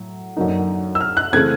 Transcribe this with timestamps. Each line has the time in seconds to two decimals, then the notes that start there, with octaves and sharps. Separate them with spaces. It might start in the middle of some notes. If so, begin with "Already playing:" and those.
Already playing: A2 F#3
0.37 F#2 D3 F#3 A#3 D#4
0.95 E6
1.01 F6
1.17 F#6
1.33 C#3 E3 A3 C4 G#6